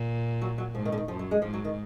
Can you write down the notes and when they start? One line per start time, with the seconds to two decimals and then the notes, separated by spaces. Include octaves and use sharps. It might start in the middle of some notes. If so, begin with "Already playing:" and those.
Already playing: A#2
0.42 F#3
0.58 F#3
0.75 G#2 F3
0.86 D#3
0.92 D3
0.98 D#3
1.08 F#2 F3
1.19 F#3
1.31 G#3
1.42 G#2 F3
1.53 F#3
1.65 D#3